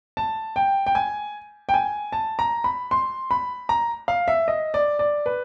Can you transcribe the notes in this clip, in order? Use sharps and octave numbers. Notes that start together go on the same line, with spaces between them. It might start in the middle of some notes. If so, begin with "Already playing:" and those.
A5
G5
G5
G#5
G5
G#5
A5
A#5
B5
C6
B5
A#5
F5
E5
D#5
D5
D5
B4